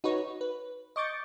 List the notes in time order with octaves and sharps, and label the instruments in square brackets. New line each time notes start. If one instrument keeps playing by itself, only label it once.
[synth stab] D#4 F#4 B4 C#5
B4
D#5 C#6 D6 G6 A6 C#7